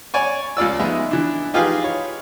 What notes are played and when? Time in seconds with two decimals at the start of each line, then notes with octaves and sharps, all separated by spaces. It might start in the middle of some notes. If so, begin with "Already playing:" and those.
0.14 C#5 D5 G#5 C#6
0.57 C#2 F4 D5 E6
0.80 G#3 B3 D#4 E5
1.11 E3 D4
1.54 D#4 F4 G4 G#4 B4 F5
1.84 C#5